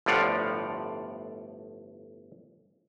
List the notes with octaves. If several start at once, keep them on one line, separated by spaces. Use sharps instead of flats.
G1 A2 F3 D5 F5 F#5